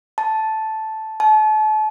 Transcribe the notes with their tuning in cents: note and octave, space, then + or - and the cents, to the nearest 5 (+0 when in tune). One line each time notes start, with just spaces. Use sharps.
A5 -5
A5 -35